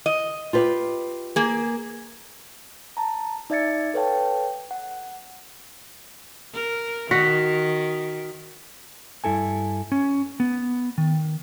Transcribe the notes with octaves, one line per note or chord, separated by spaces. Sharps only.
D#5
F4 G4 B4
A#3 G#4
A5 A#5
D#4 D5 E5 G#6 A6 C#7
A4 B4 C#5 F5 G5 A5
F#5
A#4
D#3 F#4 B6
G2 E4 A4 G#5
C#4
B3
D#3